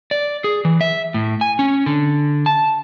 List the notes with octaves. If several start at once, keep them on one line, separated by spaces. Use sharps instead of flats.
D5
G#4
E3
E5
A2
G#5
C#4
D3
A5